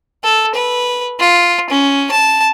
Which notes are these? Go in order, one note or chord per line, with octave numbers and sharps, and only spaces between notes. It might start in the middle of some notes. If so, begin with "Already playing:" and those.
A4
B4
F4
C#4
A5